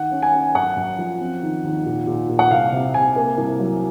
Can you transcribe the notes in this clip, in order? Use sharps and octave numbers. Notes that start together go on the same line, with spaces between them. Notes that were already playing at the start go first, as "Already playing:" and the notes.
Already playing: D#3 F#5
C#4
G#5
C#4
F#2 F#5
F#2
F3
C4
D#3
D#2
A#2
A#2
A#2
F#5
C2 F5
C3
C3 G#5
A#3
C2
F#3